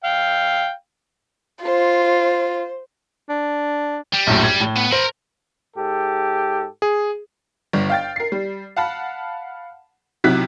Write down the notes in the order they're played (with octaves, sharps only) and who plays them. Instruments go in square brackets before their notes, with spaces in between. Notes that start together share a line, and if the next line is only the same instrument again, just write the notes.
[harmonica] F5 G5
[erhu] F4 [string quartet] C5
[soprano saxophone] D4
[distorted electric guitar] G3
[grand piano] A#1 F#2 A2
G#6
A2
[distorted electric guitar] B3
[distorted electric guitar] A#4 B5 [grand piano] C5
[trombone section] G#2 G4 A4
[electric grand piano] G#4
[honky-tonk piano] G1 G2
F5 G5 A6
A#4 C7
G3
F5 F#5 A5 B5
B1 C3 F#3 E4 F#6 B6